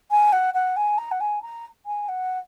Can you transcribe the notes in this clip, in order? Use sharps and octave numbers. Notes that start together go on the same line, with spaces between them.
G#5
F#5
F#5
G#5
A#5
F#5
G#5
A#5
G#5
F#5